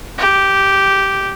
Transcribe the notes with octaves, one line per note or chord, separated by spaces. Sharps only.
G4